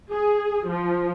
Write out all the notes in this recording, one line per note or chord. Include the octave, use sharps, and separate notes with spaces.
G#4
F3